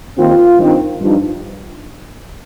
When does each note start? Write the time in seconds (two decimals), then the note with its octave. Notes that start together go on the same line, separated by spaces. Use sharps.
0.18 D#2 D#3 C4 F4
0.60 G2 D#3 C4 D#4
1.01 G2 F3 D#4